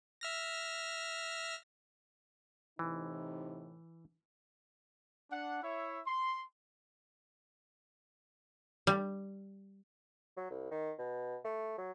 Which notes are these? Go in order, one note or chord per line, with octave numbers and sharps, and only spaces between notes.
E5 F6 A#6
A2 C3 E3 D#4
D4 F#5
E4 C#5 E5
C6
G3
F#3
C2
D#3
B2
A3
F#3